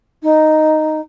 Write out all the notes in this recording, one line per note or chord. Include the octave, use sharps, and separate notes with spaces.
D#4